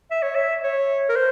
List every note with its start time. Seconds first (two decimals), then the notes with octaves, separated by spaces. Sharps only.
0.11 E5
0.22 C#5
0.35 E5
0.64 C#5
1.09 A#4
1.16 C5